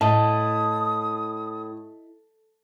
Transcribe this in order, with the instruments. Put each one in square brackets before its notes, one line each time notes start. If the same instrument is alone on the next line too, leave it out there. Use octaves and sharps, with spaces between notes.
[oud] A2 [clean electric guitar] E4 D#5 [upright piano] A5 [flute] D#6